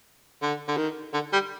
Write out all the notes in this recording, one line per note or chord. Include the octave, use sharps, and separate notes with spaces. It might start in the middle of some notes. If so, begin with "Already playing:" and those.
D3
D3
D#3
D3
G3